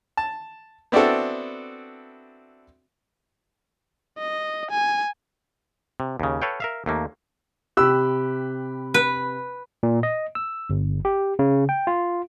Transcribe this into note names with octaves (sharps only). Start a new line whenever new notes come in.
A5
B3 C4 D4 E4 F#4 A4
D#5
G#5
C3
D#2 C#3
A4 B4 C#5 F5 G5
A#4 E5 F5
D#2 A3 A#3
C3 G4 B5 E6 F#6
B4
A#2
D#5
E6
G1
G4
C#3
G5
F4